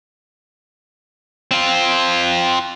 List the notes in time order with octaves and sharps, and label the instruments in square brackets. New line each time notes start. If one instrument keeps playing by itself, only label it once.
[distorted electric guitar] C4 F4